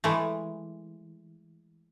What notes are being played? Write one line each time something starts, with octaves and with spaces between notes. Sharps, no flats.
E3 G#3 A3